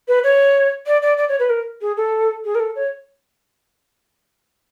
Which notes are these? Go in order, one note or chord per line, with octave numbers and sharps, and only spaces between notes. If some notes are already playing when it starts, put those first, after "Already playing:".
B4
C#5
D5
D5
D5
C#5
B4
A#4
G#4
A4
G#4
A#4
A4
C#5